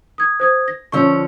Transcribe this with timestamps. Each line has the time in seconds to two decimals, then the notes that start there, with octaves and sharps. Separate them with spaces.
0.18 D#6 G#6
0.40 C5 D#6 G#6
0.68 A#6
0.92 D3 F3 C#4 C#6 E6